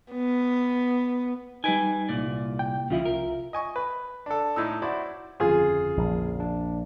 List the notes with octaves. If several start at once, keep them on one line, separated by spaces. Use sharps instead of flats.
B3
G3 D#4 B4 G5 G#5
C2 A#2 D5
G5
C2 C#3 F3 E4 F4 E5
A#4
D#5 G#5 C#6
B4
D4 A4
A2 D#4 E6
E4 F#4 C5 D5
G1 F2 C#3 F4 G#4
A#1
D4